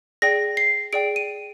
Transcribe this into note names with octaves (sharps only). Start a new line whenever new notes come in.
G#4 D5 G5 A#6
C7
G#4 D5 G5 D7
D#7